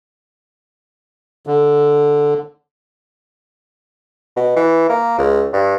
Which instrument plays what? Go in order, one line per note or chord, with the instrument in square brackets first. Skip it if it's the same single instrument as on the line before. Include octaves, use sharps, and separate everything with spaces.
[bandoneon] D3
[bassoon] B2
E3
A#3
C#2
G2